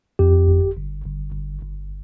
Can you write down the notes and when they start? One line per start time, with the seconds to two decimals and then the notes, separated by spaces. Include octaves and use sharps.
0.19 F2 G4
0.48 G1
0.76 G1
1.04 G1
1.33 G1
1.62 G1